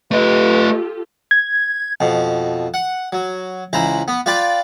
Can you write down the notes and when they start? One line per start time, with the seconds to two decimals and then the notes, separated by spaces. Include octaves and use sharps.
0.11 A3 F4 G4 A4 B4 D#5
1.31 G#6
2.00 F2 B2
2.74 F#5
3.12 F#3
3.73 C#2 E3 C5 A#5 B5
4.08 B3
4.26 F4 B4 D5 G5 B5